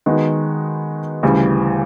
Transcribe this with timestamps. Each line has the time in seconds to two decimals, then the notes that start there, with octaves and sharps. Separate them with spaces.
0.06 D#3 G#3 B3 D#4 F#4
1.23 D2 C#3 E3 G3